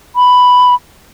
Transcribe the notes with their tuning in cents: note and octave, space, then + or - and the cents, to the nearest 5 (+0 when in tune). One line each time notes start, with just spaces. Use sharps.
B5 +5